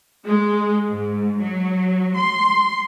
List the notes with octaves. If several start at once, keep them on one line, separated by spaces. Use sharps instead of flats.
G#3
G#2
F#3
C6